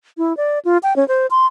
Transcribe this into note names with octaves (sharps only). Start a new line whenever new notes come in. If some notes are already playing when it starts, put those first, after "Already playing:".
E4
D5
F4
G5
C#4
C5
C6